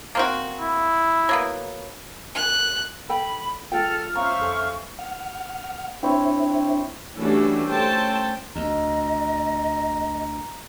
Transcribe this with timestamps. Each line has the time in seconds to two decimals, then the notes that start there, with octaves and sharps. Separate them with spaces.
0.15 A#3 C4 F#4
0.60 E4
1.29 F#3 A#3 B3
2.35 F#6
3.09 A4 G5 B5
3.72 G#3 F4 A4 G5 F6
4.15 C#4 C5 E5 F5 A#5 C#6
4.39 F2 A4 G#5
4.99 F#5 F6
6.03 C4 D4 E4 C5 C#5 E5
7.19 E3 G3 A3 C#4 D4 F#4
7.68 A3 C#4 A4 C5 G5 A5
8.56 D2 D#5 A#5